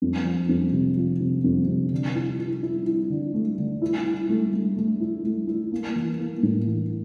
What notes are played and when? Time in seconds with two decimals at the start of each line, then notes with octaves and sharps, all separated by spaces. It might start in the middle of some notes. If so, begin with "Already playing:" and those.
0.02 F2
0.25 F3
0.49 F2
0.73 C3
0.97 F3
1.20 C3
1.44 F2
1.67 C3
1.92 D3
2.15 E4
2.39 E4
2.63 E4
2.86 E4
3.10 D3
3.34 A3
3.58 D3
3.82 E4
4.05 E4
4.29 A3
4.53 A3
4.76 A3
5.00 E4
5.24 A3
5.47 E4
5.72 A#3
5.95 E3
6.19 A#3
6.43 A2
6.66 E3